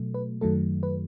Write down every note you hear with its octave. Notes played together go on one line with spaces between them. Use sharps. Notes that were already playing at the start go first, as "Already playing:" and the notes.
Already playing: B2 F#3 A3
B4
F#2 D#3 F#3 A3 A4
B4